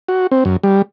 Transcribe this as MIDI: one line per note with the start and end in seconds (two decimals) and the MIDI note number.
0.08 0.27 66
0.32 0.44 60
0.45 0.56 42
0.63 0.82 55